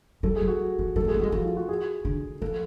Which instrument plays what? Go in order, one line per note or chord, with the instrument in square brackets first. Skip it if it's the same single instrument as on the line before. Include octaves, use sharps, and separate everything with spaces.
[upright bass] F#3 [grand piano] A4
[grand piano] G#4
[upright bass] F#3
[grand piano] F#4
[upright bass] F3
[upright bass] F#3 [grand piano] A4
[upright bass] A3
[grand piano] G#4
[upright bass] B3
[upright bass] G#3 A3 [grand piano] F#4
[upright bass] F3 [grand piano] G#4
[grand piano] F4
F#4
G#4
[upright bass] D3
[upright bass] F3 [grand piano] A4